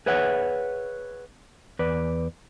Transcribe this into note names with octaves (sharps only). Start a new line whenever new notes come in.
G#4 B4 C#5 E5 F#5
E2 B4 D5